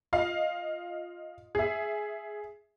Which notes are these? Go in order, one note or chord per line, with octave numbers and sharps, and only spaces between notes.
F4 D#5 F5
G#4 E5